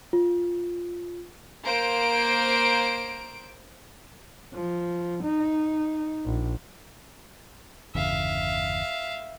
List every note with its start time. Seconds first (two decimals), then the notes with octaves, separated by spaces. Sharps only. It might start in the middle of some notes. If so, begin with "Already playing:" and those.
0.13 F4
1.63 A#3 C5 D7
4.54 F3
5.23 D#4
6.25 A#1
7.95 G1 E2 C#3 E5 F5